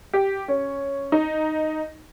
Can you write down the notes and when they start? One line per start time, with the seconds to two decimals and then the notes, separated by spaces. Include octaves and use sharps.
0.13 G4
0.48 C#4
1.12 D#4